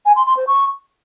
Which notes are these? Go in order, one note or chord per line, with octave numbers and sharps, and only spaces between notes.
G#5
C6
C6
C5
C#6